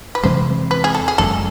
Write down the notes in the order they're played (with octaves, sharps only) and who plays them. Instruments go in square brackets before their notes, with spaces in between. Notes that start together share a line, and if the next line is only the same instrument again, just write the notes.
[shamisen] B4
[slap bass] E2 C3 E3 G#3 [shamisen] C5
[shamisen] B4
G#4
A4
G#4
[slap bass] F#1 F#2 D#3 G#3 [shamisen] A4